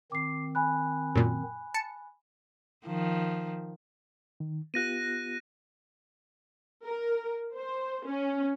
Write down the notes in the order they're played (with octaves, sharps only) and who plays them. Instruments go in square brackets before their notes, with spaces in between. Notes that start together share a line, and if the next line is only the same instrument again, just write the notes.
[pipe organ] D#3 C4 [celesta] D6 C7
[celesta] G#5 B5 F#6
[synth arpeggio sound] F#2 A#2
A5 C#7
[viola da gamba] D#3 F3
[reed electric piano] D#3
[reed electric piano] B3 F4 G4 [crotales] F#6 A#6 D#7
[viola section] A#4
C5
C#4